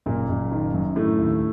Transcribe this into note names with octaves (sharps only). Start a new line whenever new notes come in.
F#1 A#2 A#3
F#1
D#3
F#2
A2 D3 A3
D#2